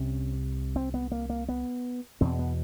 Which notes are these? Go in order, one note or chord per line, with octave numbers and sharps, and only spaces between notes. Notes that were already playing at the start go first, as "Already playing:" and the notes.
Already playing: C2 C3 C#4
C4
B3
A#3
A#3
B3
E2 B2 C4
B3